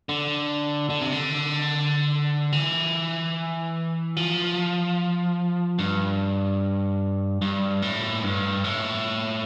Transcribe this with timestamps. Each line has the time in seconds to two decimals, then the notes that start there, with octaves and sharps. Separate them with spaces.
0.09 D3
0.90 D3
1.01 C3
1.12 D3
2.53 E3
4.17 F3
5.79 G2
7.42 G2
7.82 A2
8.24 G2
8.64 A2